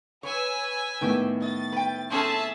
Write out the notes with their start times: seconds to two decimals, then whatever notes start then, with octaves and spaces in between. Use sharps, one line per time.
0.23 B4 C#5 G#5 E6
1.01 A2 D#3 B3 G4
1.42 D#5 A6
1.72 B4 G5
2.10 C4 C#4 G#4 A4 E5 A5